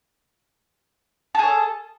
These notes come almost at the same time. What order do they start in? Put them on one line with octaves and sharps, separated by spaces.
A5 G#4 C#5 A4